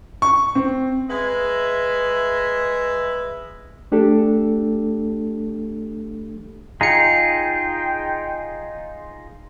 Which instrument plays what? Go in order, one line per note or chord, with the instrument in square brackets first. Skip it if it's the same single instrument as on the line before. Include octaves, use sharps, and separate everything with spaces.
[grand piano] C#6
C4
[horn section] G#3 B4 D#5 E5
[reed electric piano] A3 D4 G4 A4
[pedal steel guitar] D#4 F4 G#4 [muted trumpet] G5 [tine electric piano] A#5 C#7